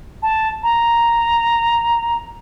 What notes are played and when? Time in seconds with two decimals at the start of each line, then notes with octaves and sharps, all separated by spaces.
0.22 A5
0.63 A#5